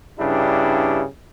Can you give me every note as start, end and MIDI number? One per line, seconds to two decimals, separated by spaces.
0.19 1.02 43
0.19 1.02 49
0.19 1.02 62
0.19 1.02 64
0.19 1.02 67